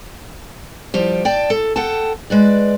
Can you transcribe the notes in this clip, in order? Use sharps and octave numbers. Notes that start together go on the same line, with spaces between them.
F3 G3 G4
D5 G5 A5
A4
A4 F#5 G5 A5
G#3 B4 D5